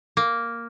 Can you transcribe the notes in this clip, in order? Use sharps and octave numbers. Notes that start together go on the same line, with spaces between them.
A#3